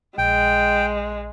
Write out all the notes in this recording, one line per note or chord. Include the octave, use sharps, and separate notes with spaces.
A#1 G#3 G5